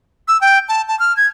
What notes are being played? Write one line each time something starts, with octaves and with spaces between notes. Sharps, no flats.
E6
G5
A5
A5
F6
G#6